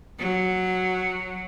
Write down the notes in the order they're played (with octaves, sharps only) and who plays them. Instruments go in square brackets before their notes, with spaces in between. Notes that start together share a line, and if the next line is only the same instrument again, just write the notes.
[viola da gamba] F#3